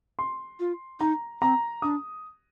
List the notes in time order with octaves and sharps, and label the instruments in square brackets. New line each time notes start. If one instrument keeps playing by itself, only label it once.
[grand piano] C6
[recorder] F4
[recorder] D#4 [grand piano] A#5
[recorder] C4 [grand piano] A#5
[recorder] D4 [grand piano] D#6